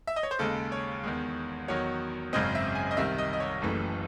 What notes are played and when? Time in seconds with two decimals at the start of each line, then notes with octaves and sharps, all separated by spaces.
0.07 E5
0.16 D#5
0.23 C#5
0.31 C5
0.39 D#2 C#3 G#3 A4
0.72 C#5
1.03 E2 D#3 G#3
1.68 E2 D#3 F#3 C#5
2.33 G#1 F#2 C#3 G#3 C4 D#5
2.55 E5
2.75 G#5
2.91 D#5
2.97 C2 C3 D#3 E5
3.18 D#5
3.33 D#5
3.40 C#5
3.62 F#1 F#2 E3 A3